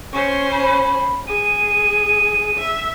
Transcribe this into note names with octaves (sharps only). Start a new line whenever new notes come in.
C#4 C5 C#6
B5
G#4 D#7
E5